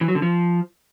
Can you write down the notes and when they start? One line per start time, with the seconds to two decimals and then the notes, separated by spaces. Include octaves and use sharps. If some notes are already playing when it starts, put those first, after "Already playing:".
0.01 E3
0.08 F#3
0.15 D3
0.22 F3